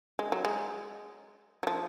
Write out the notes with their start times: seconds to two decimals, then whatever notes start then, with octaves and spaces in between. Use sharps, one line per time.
0.19 G#3
0.32 F#3
0.45 G#3
1.63 F#3
1.67 F3